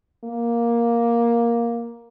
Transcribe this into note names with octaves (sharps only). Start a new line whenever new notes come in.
A#3